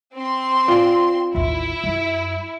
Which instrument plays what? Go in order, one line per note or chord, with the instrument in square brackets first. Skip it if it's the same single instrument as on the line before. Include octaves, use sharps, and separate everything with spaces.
[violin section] C4 C6
[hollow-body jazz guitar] F4 D5
[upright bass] A1 D#2 [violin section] E4
[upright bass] F#2